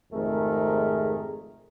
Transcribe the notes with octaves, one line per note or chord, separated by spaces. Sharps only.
G#1 F2 C3 A3 G#4 A#4